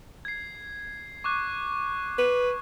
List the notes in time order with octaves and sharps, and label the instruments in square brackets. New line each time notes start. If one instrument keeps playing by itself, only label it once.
[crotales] G#6 C7
C#6 D6 F#6
[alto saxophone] B4